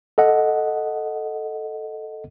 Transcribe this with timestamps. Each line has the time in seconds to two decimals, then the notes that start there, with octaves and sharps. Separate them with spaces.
0.18 A4 D#5 F#5